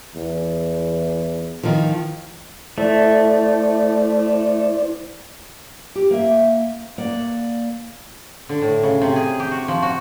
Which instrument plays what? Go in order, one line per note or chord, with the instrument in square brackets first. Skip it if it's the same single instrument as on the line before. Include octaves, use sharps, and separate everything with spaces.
[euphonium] E2
[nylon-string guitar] D#3 F3
[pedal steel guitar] A3 [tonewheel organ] E4 C5 D5
[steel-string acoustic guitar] G4
A#3 E5
A#3 D5 F#5
[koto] D3
A2
C#3
C3
G#4
G4
F#4
F3
F#4